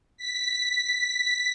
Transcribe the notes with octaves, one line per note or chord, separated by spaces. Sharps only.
B6